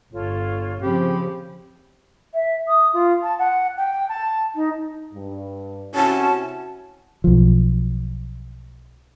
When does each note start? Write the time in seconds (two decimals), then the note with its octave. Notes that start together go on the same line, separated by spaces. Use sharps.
0.12 G1 F4 A4 C#5
0.82 C#3 F3 C4 G4 B5
2.33 E5
2.68 D#6
2.93 F4
3.23 A5
3.38 F#5
3.77 G5
4.08 A5
4.55 D#4
5.13 G2
5.95 C3 C#4 E4 F#4 A5
7.24 B1 F3